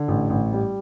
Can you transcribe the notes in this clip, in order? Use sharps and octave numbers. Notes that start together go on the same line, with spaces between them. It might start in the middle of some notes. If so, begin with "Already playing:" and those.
Already playing: D3
A1
A1
G3